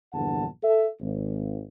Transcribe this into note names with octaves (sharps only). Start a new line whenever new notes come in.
A#1 E2 G2 D3 F#5 A5
A4 E5
G#1